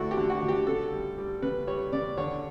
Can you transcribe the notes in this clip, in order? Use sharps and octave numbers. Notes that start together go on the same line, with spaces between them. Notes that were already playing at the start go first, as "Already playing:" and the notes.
Already playing: D3 A3 D4 E4 F#4
G4
D3
F#4
D3
G4
C#3 A4
G3
G3
C#3 B4
G3 C#5
C#3 D5
D3 C#5